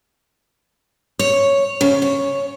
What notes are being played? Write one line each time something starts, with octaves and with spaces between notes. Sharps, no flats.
C#5
C#3
C#5